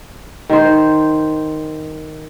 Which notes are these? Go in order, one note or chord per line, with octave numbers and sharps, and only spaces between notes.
D#3 C5